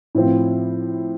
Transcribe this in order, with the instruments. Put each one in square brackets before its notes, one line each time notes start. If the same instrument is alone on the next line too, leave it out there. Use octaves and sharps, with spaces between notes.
[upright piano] A2 F3 C4